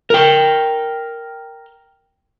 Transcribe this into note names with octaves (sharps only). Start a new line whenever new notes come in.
A#4 G5